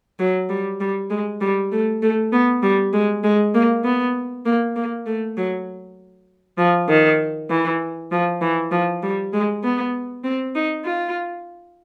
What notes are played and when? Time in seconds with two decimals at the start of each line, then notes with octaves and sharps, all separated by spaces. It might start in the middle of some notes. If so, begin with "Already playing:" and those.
0.19 F#3
0.50 G3
0.80 G3
1.10 G#3
1.41 G3
1.72 A3
2.02 A3
2.33 B3
2.63 G3
2.93 G#3
3.24 G#3
3.54 A#3
3.85 B3
4.46 A#3
4.76 A#3
5.06 A3
5.37 F#3
6.58 F3
6.89 D#3
7.50 E3
8.11 F3
8.41 E3
8.71 F3
9.03 G3
9.33 G#3
9.64 B3
10.24 C4
10.55 D#4
10.85 F4